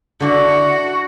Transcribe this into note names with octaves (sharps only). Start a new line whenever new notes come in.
D3 D4 E4 F#4